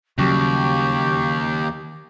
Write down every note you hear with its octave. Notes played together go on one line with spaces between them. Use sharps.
D#2 C#3 F#3 G3 G4 C#6